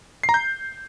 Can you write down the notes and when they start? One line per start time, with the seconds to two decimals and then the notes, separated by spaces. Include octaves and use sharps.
0.23 C7
0.29 A#5
0.34 G6